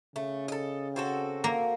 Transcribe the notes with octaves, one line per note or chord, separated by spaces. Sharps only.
C#3 A3
A4 D#5
C4 F#4 A4
A#3